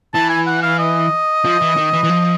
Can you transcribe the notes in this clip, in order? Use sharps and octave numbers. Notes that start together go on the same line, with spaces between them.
E3 A5
G#5
F#5
F5
D#5
F3
E3
D#3
E3
E3
F3